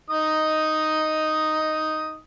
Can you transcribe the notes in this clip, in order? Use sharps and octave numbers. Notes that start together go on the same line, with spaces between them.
D#4 D#6